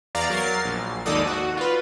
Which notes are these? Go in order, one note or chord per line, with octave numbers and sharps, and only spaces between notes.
E2 D5 F5 A#5 A6
F#3 A#4 A6 C7
A#1
G#1 D#2 D#4 A4 D5 D#6
F#4
F4 B4